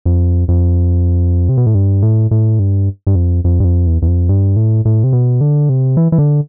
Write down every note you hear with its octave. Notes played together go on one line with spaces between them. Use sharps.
F2
F2
C3
B2
A2
G2
A2
A2
G2
G2
F2
F2
G2
F2
E2
E2
F2
G2
A2
A2
C3
B2
D3
C3
E3
E3
D3